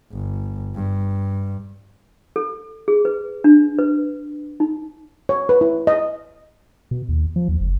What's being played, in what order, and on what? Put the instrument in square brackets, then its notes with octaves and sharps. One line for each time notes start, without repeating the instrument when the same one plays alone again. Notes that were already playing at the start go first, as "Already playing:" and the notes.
[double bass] G1
G2
[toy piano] A4
G#4
B4
D4
B4
D#4
[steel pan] C#5
B4
E4
D#5
[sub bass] B2
D#2
F3
D#2
F#1